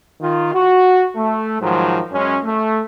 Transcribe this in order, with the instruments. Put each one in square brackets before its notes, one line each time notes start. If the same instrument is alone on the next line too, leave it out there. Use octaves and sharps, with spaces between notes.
[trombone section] D#3 F4
F#4
A3
G#2 D#3 F3 F#3
F#2 G#3 C#4
A3